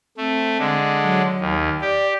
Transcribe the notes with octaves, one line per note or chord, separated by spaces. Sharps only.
A3 C4
D3 G#3
F#3
D#2
G4 D5